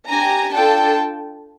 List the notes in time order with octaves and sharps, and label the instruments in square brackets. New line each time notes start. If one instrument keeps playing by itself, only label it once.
[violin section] D4 G4 G#5 A#5
D4 F4 A4 G5 A5